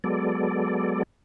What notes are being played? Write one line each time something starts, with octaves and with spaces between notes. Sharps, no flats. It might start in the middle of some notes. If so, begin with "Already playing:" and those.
F#3 G#3 B3 A4 D5